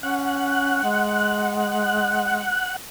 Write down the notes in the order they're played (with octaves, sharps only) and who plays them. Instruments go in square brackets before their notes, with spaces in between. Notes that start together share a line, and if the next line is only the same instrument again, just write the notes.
[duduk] C#4 [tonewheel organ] F#5
[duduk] G#3